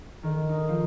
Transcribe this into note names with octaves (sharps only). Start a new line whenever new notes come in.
D#3
D#4
F3